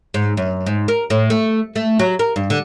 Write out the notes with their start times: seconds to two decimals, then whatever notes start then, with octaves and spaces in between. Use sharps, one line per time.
0.14 G#2
0.37 F#2
0.66 G#2
0.88 A#4
1.10 A2
1.30 A3
1.76 A3
1.99 F#3
2.19 A#4
2.36 G2
2.50 D3